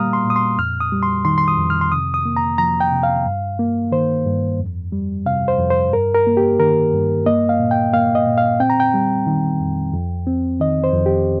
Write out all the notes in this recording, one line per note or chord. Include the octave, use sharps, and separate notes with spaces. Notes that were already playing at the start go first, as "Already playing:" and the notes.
Already playing: A#2 G3 A#3 F5 A#5 D#6 F6
C6
A#2
D#6
C6
F2 F6
D#6
G3
C6
D#3 C6
C6
D#6
F2
F6
C6
C3 D#6
D#6
A#3
A#5
F3 A#5
G5
C3
F5
G2
A#3
D#3 C5
G2
F2
G3
C3 F5
C5
F2
C5
G2 A#4
A#4
A#3
G4
D#3 A#4
G2
A#3 D#5
F5
A#2
G5
A#3 F5
D#5
A#2
F5
C4 G5
A#5
G5
G3
D#3
F2
F2
C4
D#3 D#5
C5
F2
G4